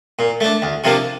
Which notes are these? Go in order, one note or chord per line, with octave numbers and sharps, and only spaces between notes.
A#2
A3 D4
D2
C3 F3 A#3 D4